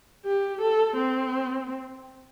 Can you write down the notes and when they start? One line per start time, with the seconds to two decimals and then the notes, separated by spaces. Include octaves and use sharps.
0.25 G4
0.61 A4
0.97 C4